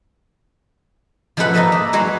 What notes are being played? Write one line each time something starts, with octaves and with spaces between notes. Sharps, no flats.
F3 G#3 A3 A4 B4 F#5
A#3 D#4 A4 B4 D#5 E5
A#3
F#3 G#3 F#4 B4